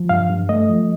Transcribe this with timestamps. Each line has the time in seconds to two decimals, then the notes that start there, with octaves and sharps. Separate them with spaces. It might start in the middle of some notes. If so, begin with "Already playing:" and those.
Already playing: F3
0.09 G2 F5
0.30 G2
0.49 A3 D#5
0.69 F3